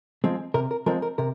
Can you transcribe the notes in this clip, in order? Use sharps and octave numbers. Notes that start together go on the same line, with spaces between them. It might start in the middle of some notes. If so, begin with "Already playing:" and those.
F3 G#3 C4
C3 A#4
A#4
F3 G#3 C4 A#4
A#4
C3 A#4